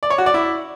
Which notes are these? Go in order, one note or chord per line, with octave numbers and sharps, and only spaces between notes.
D5
C#5
F#4
D5
E4